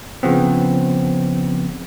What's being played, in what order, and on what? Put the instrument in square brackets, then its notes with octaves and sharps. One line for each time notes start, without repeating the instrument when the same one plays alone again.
[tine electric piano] C#3 F3 B3 C4